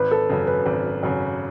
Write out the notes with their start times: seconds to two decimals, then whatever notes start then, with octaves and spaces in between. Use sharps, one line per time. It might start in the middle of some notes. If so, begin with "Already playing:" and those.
Already playing: G#1 B4
0.11 A4
0.29 F#2 C#3
0.47 B4
0.66 G#1
1.03 F#2 C#3